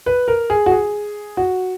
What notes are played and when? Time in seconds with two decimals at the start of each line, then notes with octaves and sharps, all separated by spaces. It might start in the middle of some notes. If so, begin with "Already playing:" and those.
0.06 B4
0.28 A#4
0.50 G#4
0.66 F#4
0.72 G#4
1.37 F#4